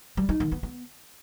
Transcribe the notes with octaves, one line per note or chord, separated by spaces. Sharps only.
G3
D#4
D#3
B3
B3